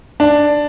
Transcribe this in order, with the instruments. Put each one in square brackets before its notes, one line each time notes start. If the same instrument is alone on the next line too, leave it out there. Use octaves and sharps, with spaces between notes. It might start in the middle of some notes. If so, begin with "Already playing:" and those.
[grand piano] D4